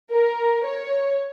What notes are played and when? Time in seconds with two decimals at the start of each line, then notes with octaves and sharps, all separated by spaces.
0.11 A#4
0.65 C#5